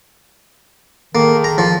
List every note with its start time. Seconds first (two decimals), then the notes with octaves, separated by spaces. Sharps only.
1.15 D#3 A#3 G#4 A4 A5
1.44 A#5
1.58 F3